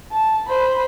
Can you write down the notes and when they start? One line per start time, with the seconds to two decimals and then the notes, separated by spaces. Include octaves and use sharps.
0.12 A5
0.48 C5 B5